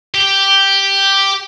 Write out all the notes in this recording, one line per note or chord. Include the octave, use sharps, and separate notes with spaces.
G4